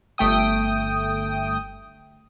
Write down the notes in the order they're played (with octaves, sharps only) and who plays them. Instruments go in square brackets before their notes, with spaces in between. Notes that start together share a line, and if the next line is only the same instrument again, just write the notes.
[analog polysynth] G1 A3 G5 D#6